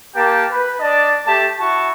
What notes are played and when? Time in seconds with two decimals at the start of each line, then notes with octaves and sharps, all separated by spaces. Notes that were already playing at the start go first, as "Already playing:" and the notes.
0.13 A#3 G4 G5 A5
0.49 B4
0.79 D4 D5 D#5 A5
1.25 A3 G4 A5
1.58 E4 F#4 A5 C#6